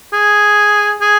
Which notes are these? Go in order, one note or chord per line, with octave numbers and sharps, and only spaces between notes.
G#4
G#4